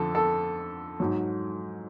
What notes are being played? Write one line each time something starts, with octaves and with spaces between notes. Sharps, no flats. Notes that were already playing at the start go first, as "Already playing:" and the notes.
Already playing: F2 D3 A4
A4
G#2 F#3